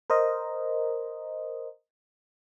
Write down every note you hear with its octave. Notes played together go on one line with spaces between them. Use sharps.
A#4 C5 D#5